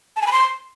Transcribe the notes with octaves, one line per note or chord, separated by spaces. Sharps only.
A5
G#5
B5
C6